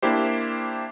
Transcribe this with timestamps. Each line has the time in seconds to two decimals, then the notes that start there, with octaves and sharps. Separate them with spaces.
0.02 A#3 D4 E4 G4 C5